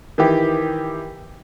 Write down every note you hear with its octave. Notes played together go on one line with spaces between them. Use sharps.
D#3 E3 G4